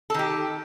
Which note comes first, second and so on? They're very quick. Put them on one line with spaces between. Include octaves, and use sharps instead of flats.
A4 D#3 G4